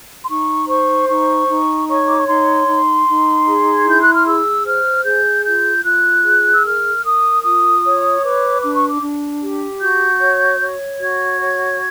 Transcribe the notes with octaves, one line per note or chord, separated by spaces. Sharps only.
C6
D#4 C#6
C5 C#6
D#4 C#6
D#4
C#5 C#6
D6
C#6
D#4 C6
D#4
D#4
G#4
G#6
E4 G6
F#6
F6
G#4 E6
C5 F6
G#4 G6
F4 G6
F4 F#6
G#4
E6
A#4 F6
A#4 D#6
F4 D#6
C#5
B4 D6
D4 D6
C#6
D6
D4
G4
F#4 G6
C#5
C#5
F#4 G#6
C#5